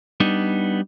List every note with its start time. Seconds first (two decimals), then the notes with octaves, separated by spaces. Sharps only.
0.20 G3 B3 D4 D#4